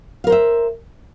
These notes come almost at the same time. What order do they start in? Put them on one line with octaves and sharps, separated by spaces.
F5 A#4 C5 E5